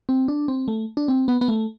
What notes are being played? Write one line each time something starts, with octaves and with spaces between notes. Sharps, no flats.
C4
D4
C4
A3
D4
C4
B3
B3
A3